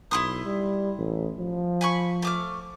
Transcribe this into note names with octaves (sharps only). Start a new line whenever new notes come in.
B1 E4 C6 D#6
G3
A1
F3
G#5 B5 C#6
A3 D6 F6